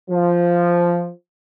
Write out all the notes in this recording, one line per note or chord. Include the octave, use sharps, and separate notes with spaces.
F3